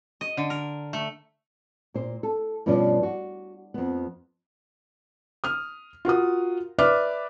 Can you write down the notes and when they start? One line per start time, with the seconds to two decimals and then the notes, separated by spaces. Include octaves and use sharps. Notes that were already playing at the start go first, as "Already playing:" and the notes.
0.21 D#5
0.37 D3
0.50 A#4
0.93 A3
1.94 A#2 C5
2.23 A4
2.66 G2 B2 F3 C#4 D5
3.03 F#4
3.74 F2 B3
5.44 D#6 F6
6.05 F4 F#4 A#4 D#6
6.78 B4 D5 E5 D6 F6